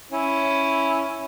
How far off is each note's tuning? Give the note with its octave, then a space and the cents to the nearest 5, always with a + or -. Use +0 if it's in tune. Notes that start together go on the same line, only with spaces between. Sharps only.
C#4 +0 E4 +0